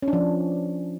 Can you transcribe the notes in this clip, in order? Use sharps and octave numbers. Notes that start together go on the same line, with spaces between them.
C#4
D4
F3